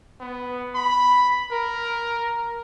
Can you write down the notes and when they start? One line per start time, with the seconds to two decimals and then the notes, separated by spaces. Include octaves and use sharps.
0.21 B3
0.75 B5
1.51 A#4